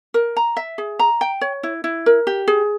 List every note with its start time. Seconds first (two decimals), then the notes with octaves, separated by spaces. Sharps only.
0.14 A#4
0.37 A#5
0.57 E5
0.78 G#4
0.99 A#5
1.21 G5
1.41 C#5
1.63 E4
1.84 E4
2.06 A#4
2.27 G4
2.48 G#4